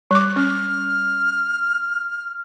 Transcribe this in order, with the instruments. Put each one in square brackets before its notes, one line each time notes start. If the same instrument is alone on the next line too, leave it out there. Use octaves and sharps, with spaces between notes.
[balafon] G3 D6 [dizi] F#6
[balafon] C#4 [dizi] F6